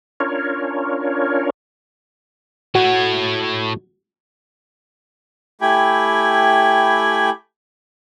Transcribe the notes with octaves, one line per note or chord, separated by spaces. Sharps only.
C#4 D4 F4 A#4 C#5
A2 F#4 C#5
A3 E4 G4 G5 G#5 B5